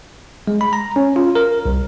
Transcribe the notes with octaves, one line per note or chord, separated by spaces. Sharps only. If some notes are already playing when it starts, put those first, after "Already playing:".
G#3
B5
A#5
C#4
F4
A#4
C2